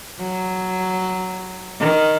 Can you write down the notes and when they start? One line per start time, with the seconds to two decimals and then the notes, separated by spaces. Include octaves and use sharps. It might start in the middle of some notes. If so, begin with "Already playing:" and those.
0.19 F#3
1.80 D#3